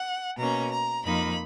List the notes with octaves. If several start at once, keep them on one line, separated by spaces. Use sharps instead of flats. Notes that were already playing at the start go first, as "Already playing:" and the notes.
Already playing: F#5
B2 A#3 C#4 A#5
A#5
F2 F3 A#3 D#4 B5